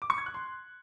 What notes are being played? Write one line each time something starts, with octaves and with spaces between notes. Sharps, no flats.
D6
C#6
G#6
F#6
C6